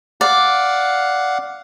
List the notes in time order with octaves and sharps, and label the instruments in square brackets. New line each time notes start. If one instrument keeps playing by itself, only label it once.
[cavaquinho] D5 [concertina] F5 F#5